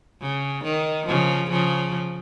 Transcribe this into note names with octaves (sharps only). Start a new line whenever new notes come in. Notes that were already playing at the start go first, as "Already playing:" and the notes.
C#3
D#3
C#3 F3
C#3 F3